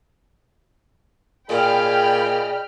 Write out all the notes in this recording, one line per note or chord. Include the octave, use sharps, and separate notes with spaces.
A#2 G#4 D5 D#5 G5 B5 F6